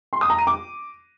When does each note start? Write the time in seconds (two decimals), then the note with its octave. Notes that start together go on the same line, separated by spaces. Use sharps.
0.13 C6
0.21 D#6
0.30 A#5
0.38 D#7
0.47 D6